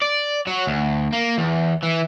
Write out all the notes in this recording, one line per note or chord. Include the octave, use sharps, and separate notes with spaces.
D5
F#3
D2
A#3
E2
E3